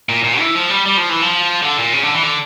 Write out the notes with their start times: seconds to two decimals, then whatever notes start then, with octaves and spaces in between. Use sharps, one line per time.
0.09 A#2
0.24 A#2
0.39 E3
0.55 F3
0.70 G3
0.86 G3
0.97 F3
1.09 E3
1.22 F3
1.62 D3
1.78 A#2
1.93 C#3
2.03 D3
2.14 E3
2.23 D3